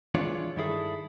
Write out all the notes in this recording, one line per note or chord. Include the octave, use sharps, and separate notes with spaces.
E3 G#3 D4 F4 C#5
G2 D#3 E4 G#4 A4